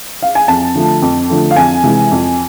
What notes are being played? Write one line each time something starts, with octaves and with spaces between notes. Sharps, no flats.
F5
G#5
F2 A5
D3 F3 A3
F2
D3 F3 A3
F5
F2 G#5
C3 E3 G#3
F2